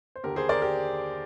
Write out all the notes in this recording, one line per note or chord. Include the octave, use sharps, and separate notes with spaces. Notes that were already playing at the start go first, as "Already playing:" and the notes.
C5
D#2 D3 G4 A#4
G#4 C5
A#4 D5
G4 A#4